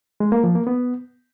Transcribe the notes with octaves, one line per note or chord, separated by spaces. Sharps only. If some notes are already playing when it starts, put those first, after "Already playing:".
G#3
A#3
F3
A#3
B3